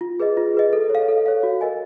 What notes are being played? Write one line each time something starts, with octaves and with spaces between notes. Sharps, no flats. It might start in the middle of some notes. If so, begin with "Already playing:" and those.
F4
G#4 B4 D#5
F4
G#4 B4 D#5
A4
C#5 F5
A4
C#5 F5
F#4
A#4 D#5 G#5